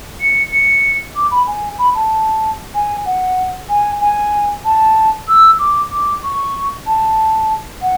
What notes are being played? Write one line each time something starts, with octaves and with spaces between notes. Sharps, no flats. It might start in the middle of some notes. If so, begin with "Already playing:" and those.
C#7
C#7
D6
B5
G#5
B5
A5
G#5
F#5
G#5
G#5
A5
E6
D6
D6
C#6
A5
F#5